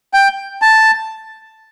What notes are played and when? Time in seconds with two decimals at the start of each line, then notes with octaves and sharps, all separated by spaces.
0.13 G5
0.62 A5